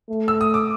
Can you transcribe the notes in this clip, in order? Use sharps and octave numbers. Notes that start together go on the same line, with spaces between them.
A3
E6
D#6
D6